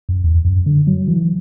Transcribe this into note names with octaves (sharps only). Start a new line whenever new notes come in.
F#2
E2
F#2
D3
F#3
E3